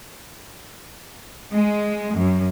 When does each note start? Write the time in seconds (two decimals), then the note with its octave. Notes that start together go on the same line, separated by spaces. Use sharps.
1.54 G#3
2.15 F#2